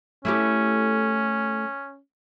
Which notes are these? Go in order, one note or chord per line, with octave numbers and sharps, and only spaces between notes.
A3 C#4 E4 G4